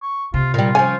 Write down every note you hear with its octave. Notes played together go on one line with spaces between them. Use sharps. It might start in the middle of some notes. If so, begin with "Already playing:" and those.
C#6
C3 F4
A#2 G3 F4
F3 C#4 G#5